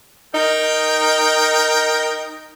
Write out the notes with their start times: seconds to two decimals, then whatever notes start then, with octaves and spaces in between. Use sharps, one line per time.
0.34 D#4 A#4 G5